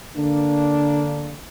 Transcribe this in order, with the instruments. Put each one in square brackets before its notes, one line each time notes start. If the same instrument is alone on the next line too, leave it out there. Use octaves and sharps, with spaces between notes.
[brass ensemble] D3 A#3 D4